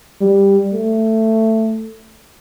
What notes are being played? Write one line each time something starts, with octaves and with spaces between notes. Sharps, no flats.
G3
A3